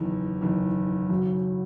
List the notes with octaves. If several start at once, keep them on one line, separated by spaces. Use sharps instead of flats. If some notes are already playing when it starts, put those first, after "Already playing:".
Already playing: F#1 E2 D#3
F#1 E2 D#3
G#1 F#2 C#3 F#3